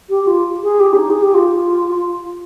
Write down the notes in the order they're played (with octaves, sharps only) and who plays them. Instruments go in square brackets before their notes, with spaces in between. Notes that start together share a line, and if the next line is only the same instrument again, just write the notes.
[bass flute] G4
F4
G#4
G4
C#4
D#4
G#4
G4
F4